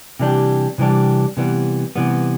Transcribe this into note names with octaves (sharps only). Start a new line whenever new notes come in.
C3 E3 G3 D4 G4
C3 E3 G3 D4 G4
C3 E3 G3 B3
C3 E3 G3 B3